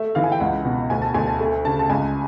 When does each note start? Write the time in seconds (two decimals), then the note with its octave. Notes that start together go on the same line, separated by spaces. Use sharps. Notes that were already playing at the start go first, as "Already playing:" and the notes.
Already playing: A3 E5
0.15 E3 F5
0.24 G#5
0.32 G5
0.40 C#2 F#5
0.65 B2
0.90 D2 G#5
1.02 A5
1.14 D2 G#5
1.27 A5
1.40 A3
1.65 C#3 A5
1.79 A5
1.90 C#2 G#5